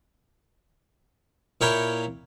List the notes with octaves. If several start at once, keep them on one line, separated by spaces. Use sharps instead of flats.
A#2 E4 A#4 C#5 G5 B5